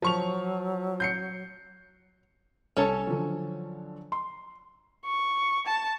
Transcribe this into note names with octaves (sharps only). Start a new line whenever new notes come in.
F3 F#3 C#6 F7
G6 C7 C#7
C2 C#4 A4 C#5 A5 C#6
D3 F3 F#3
C6
C#6
A5